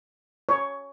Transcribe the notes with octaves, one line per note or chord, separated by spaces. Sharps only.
C#5